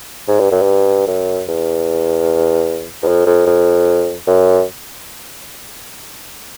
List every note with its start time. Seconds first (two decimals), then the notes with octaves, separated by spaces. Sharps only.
0.28 G#2
0.40 G2
0.51 F#2
0.62 G2
1.07 F#2
1.48 E2
3.03 E2
3.07 F2
3.26 F2
3.46 F2
4.27 F#2